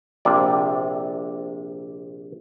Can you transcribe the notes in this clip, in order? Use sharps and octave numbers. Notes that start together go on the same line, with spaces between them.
A#1 C3 D5